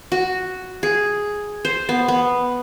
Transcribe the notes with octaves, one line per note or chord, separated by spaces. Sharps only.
F#4
G#4
C5
B3
B3